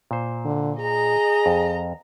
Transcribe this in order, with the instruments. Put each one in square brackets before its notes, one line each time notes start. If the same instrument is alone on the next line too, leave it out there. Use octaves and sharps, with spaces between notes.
[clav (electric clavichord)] A#2 C5
[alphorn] D3
[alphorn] G#4 [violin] D#5 A#5
[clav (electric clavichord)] F2